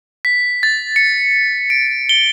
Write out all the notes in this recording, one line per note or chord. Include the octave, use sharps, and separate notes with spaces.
B6
A6
C#7
D7
G7